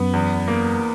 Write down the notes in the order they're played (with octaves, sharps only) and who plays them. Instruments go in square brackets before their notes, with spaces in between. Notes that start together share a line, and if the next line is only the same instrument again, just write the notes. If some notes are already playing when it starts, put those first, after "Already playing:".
Already playing: [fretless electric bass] F#2 [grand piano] B3
[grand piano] E2
A#3